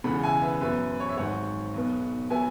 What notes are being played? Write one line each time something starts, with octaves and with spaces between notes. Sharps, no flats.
E1 E2 C#3 F#5 B5
E5 G#5
B4 E5
F#2 F#3 B3 B4 E5
B4
C#5
E5
G#1 G#2 F#3 C#5 F#5
B1 B2 B3
F#3 B3 E5 G#5